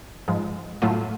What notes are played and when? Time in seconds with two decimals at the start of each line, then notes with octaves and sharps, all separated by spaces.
0.28 G#2 F3 G#3
0.82 A2 F#3 A3 F4